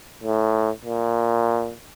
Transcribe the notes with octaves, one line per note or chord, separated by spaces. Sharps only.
A2
A#2